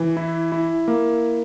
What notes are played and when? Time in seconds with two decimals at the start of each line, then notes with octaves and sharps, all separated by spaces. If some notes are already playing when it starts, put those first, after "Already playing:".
Already playing: E3
0.17 E4
0.52 E4
0.88 A#3